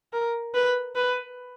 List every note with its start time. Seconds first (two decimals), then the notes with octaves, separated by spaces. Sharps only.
0.13 A#4
0.54 B4
0.95 B4